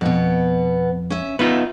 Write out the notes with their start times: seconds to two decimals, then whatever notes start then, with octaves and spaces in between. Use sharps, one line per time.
0.01 F2 B2 B3
1.10 C#4 E5
1.39 B3 D#4 F4 E5